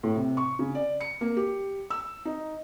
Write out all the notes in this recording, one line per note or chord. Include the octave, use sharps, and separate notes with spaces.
A2
C3
C#6
C#3
D5
C#7
A#3
G4
E6
D#4